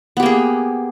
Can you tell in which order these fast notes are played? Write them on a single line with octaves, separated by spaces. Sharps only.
B3 G4 A#3 G#4